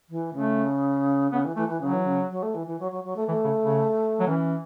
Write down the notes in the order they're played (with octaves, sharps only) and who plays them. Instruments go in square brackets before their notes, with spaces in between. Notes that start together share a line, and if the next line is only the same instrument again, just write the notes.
[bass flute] E3
[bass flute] C#3 [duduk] A3
[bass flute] C#3 [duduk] B3
[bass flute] E3
[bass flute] E3 [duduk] A3
[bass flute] E3
[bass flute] C#3 [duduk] F#3
[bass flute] E3
C#3
F#3
A3
E3
E3
F#3
F#3
F#3
A3
[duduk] E3 [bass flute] A3
[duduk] C#3
C#3
F#3
[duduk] E3 [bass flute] C#4